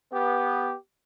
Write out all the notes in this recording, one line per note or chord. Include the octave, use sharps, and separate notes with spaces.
B3 G4